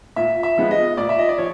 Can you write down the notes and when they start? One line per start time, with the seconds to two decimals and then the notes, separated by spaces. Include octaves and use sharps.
0.16 A#2 E5
0.43 E5
0.58 F3 G#3 B3
0.71 D#5
0.97 A#2 D5
1.09 E5
1.19 D#5
1.29 D5
1.38 F3 C#5